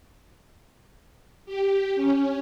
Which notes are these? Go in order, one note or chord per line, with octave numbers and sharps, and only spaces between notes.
G4
C#4